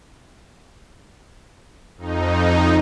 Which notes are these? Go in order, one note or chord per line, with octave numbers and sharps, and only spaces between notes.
F2 D#4